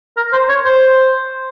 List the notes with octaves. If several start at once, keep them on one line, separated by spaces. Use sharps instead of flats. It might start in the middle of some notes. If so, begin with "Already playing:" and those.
A#4
C5
C#5
C5